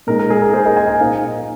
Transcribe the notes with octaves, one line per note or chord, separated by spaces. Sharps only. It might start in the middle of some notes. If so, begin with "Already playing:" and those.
A#2 G#3 D#4 A#4
A#4
G#4
A#4
G#4 C5
A#4 D#5
D#5 G#5
D#5 G#5
A#2 A#3 D#4 C5 F5